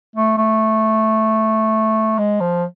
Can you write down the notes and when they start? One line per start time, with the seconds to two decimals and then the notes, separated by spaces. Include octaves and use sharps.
0.16 A3
0.38 A3
2.19 G#3
2.41 F3